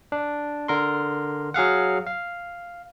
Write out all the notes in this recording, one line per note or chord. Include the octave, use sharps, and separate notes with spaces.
D4
D3 A#4 C6
F#3 G#4 F5 F#5
F5